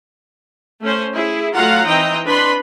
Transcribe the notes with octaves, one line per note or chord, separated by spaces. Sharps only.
A3 C#4 C5
E4 G#4
F#3 A3 F4 F5 F#5 A#5
E3 C4 D#4 D#5 G5 A#5
D4 B4 B5 C6